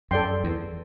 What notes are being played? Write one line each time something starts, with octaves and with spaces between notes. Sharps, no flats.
F#2 A4 D5 G5 C6
E2